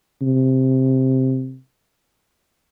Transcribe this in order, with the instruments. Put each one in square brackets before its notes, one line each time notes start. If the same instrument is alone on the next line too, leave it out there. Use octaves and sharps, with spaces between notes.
[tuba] C3